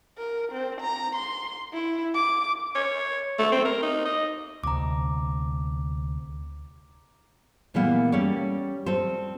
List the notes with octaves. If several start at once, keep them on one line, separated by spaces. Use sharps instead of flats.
A#4
C4
A#5
C6
E4
D6
C#5
A3
C4
A#4
D#4
D#5
D2 C3 A#5 D6
A#2 E3 G3 G#3 A#3 B3
G3 C#4 A4 C#5 D5
G3 C4 A4 C5